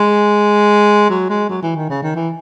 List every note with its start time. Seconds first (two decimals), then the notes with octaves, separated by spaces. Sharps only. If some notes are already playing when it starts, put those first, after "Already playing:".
Already playing: G#3
1.10 F#3
1.30 G#3
1.50 F#3
1.63 E3
1.76 D#3
1.90 C#3
2.03 D#3
2.15 E3